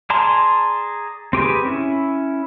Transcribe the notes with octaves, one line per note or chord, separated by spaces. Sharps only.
G#4 D5 A5 A#5 C6
C4 G4 G#4 B4
C#4 E4